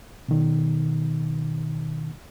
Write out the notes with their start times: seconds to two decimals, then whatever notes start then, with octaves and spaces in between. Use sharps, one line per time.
0.29 B2 D#3